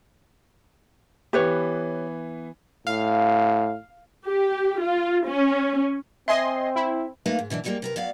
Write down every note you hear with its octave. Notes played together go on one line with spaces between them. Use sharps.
E3 B3 G4 B4 C#5
A2 F5
G4
F4
C#4
C4 D#5 E5 G#5 C6
E4
A3 A#3 D#4 B4 F5 A5
G#2
B2 E3 C#4 D4
D3 D#3 F3 G3 G#3 A#3
C3 A#4 B4
F#3 B3 D5 F5